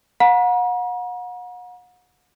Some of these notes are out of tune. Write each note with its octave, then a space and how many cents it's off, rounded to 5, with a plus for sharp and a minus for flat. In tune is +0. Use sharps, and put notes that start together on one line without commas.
F#5 -40 A#5 +40